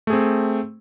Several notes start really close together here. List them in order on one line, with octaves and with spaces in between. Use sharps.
A3 G#4 C4